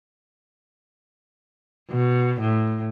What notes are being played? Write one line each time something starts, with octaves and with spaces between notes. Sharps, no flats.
B2
A2